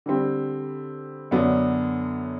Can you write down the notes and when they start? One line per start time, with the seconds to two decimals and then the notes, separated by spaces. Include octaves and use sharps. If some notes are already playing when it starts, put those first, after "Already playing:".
0.06 D3 G3 C4
1.31 F#2 D3 F#3 B3 D4